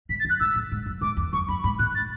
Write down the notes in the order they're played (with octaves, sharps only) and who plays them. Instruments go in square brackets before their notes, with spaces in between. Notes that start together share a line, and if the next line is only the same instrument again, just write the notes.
[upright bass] G#2 [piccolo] B6
[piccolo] A6
[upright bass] F#2
[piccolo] F#6
[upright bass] G#2 [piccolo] E6
[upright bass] A2
G#2
F#2
[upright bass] G#2 [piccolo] D6
[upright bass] E2
[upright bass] F#2 [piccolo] C#6
[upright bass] F#2 [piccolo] B5
[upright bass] G#2 [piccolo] B5
[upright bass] A2 [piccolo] F#6
[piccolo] A6